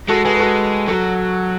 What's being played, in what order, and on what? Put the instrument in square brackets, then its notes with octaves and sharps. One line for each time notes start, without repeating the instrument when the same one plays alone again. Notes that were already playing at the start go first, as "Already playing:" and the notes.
[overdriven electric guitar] G#3 [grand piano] F#4 A4
[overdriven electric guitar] G#3 [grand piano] G#4 B4
[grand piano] B4
F#4 A4
[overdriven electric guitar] F#3 [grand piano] F#4 A4